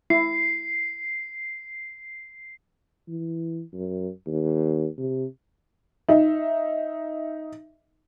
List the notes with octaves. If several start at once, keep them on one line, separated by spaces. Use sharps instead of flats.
E4 C7
E3
F#2
D#2
C3
D#4 E5